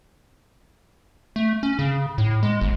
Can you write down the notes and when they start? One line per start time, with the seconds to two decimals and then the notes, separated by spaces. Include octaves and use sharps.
1.36 A3
1.63 C#4
1.79 C#3
2.18 A2
2.43 G#3
2.61 G1